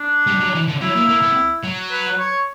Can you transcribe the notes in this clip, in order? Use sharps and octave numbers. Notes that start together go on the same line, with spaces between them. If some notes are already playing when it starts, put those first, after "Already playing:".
Already playing: D4
G3
F#3
E3
D3
F#3 E4
A#3
A#3
B3
F#3
B4
C#5